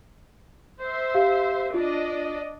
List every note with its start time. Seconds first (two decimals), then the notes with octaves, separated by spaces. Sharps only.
0.82 C5 E5
1.15 G4 F5
1.74 D4 F4 D5 D#5